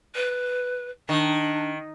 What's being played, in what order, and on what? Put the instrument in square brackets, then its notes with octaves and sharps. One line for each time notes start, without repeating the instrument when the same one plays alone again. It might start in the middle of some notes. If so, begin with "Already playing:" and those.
[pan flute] B4
[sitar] D#3 [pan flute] D4